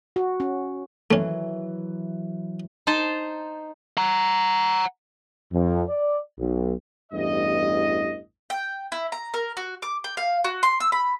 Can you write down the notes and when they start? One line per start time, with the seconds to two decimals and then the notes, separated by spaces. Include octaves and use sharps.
0.16 F#4
0.40 C#4
1.11 E3 F#3 A3 C#4
2.87 D#4 C5 A5
3.97 F#5 A#5
5.52 F2
5.88 D5
6.39 B1
7.12 A1 E2 G2 D#5
8.50 G5
8.92 E4
9.12 A#5
9.34 A#4
9.57 F#4
9.82 D6
10.04 G5
10.17 F5
10.44 F#4
10.63 C6
10.80 E6
10.92 B5